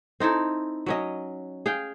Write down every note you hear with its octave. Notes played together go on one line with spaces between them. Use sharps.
C4 D#4 E4 A4
F#3 C#4 D#5
G#4 F5 G5